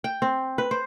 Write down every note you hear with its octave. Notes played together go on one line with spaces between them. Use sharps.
G5
C4
B4
C5